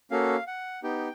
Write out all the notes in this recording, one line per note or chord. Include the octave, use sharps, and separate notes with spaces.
A#3 C#4 F#4 A4 F5
F#5
B3 D#4 G4 G5